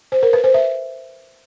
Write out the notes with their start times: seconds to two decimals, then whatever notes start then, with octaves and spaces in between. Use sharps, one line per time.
0.12 C5
0.23 A#4
0.33 B4
0.44 C5
0.54 E5